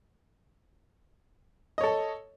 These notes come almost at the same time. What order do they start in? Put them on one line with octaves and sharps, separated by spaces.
D#5 C#5 A4